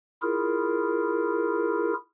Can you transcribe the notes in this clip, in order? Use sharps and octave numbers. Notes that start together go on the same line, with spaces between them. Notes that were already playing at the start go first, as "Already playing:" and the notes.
E4 F4 G#4 A#4